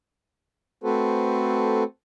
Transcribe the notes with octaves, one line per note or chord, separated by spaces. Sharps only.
A3 C4 F#4 A4 B4 C5